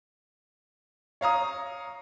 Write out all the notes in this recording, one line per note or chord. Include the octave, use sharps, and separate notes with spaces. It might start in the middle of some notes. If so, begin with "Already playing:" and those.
C#5 F5 A#5 D#6